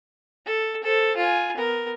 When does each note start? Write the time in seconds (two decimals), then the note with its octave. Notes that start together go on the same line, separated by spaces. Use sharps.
0.46 A4
0.83 A4 C5
1.16 F4 G#5
1.57 B3 A#4